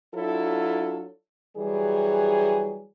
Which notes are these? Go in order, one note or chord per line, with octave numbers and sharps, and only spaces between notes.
F#3 D4 E4 F4 A4
E3 F#3 G3 G#4